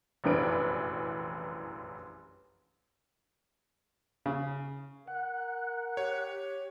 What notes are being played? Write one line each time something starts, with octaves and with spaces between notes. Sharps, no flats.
F1 A#1 F#2 E3 B4 D7
C#3
A#4 F#5
G4 C#5